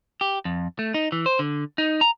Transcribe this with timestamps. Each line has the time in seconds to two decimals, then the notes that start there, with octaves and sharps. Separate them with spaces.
0.21 G4
0.45 F2
0.79 A3
0.94 D#4
1.12 E3
1.26 C5
1.39 D3
1.78 D#4
2.01 A#5